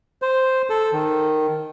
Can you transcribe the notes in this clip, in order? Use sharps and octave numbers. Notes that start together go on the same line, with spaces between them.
C5
A4
D#3